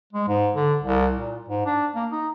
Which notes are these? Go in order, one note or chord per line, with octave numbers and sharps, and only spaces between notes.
G#3
G#2
D3
C2
A#2
G#2
D4
A#3
D#4